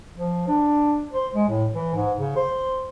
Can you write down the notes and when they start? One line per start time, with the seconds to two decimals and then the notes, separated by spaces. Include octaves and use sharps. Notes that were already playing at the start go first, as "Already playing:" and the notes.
0.15 F3
0.47 D4
1.12 C5
1.34 G#3
1.49 A2
1.74 E3
1.94 G#2
2.17 C#3
2.36 C5